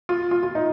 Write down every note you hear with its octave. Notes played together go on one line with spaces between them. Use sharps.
F4
F4
F4
D#4